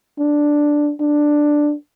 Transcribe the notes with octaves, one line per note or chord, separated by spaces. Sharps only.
D4
D4